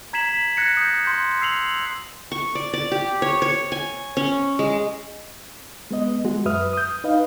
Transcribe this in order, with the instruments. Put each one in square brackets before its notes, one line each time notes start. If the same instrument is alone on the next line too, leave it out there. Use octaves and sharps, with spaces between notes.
[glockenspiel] A#5 G#6 B6 C7 E7 F#7
B6
F#6 G#6 A#6 C#7
D#6 G6
C6 G6
E6 C7 F7 F#7
[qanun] C#6
D5
D5
G4
C#5
C#5
G#5
C#4
G#3
[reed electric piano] G#3 B3 D#5
G#3 F#4
F#2 B4 E5 D#6 F6
D#6 G6
D#4 B4 D#5 F5